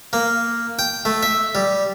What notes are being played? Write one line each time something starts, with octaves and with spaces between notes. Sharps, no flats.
A#3
G5
A3
E5
G3